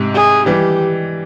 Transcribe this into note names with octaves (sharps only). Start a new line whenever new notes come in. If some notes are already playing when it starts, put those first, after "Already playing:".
Already playing: G#2 C3
G#4
E3 G3 G4